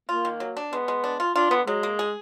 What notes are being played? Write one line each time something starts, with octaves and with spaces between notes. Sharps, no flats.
A#3 F4
D#3
F#3
D4
G#3 B3
G#3
D4
F4
D4 F4
D3 B3
F#3 G#3
A#3
G#4